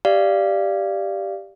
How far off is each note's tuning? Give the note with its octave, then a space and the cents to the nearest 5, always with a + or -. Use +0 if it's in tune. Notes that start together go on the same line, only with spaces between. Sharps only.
G4 +0 D5 +0 F5 -20